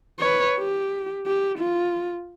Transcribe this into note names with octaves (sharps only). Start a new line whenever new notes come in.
B4 C#5
G4
G4
F4